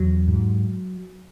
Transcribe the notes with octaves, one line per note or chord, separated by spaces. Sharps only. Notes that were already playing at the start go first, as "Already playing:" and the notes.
Already playing: E2 F#3
G#2